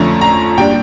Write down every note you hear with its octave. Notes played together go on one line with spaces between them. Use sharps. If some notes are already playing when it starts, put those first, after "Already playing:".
Already playing: F2 D3 F3 A3 C#4 A#5
A#5
A#2 G3 D4 G5